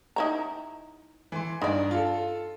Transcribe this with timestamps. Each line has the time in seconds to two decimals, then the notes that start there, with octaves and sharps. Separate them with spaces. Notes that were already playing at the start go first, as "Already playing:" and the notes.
0.16 D#4 E4 A#5
1.32 E3 C6
1.62 G2 D#4 D5
1.91 F4 A4